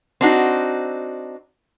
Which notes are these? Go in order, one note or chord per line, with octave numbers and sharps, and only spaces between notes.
C4 D4 D#4 F#4